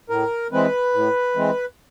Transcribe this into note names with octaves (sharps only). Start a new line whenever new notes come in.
A2 A#4
E3 G#3 C4 B4
A2
E3 G#3 C4